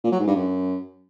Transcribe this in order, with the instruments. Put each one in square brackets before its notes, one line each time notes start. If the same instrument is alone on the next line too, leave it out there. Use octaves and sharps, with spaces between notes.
[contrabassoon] A#2
F#3
G#2
G2
F#2